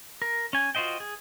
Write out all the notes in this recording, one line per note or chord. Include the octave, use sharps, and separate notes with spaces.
A#4
C#4 G#5
F4 F#4 C5 D#5 G5
G#4